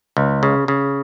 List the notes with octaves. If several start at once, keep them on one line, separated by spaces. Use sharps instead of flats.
C#2
C#3
C#3